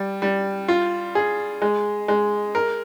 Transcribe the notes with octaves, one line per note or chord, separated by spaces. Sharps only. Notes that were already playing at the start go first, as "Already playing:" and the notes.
Already playing: G3
G3
F4
G#4
G#3
G#3
A#4